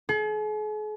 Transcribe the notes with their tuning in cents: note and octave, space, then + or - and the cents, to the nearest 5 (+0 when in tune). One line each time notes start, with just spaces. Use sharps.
G#4 +45